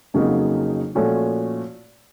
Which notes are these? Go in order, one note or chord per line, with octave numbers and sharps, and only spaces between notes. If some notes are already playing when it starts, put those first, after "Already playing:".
F2 C#3 F#3 A#3 D#4
A#2 F3 A3 C#4 F#4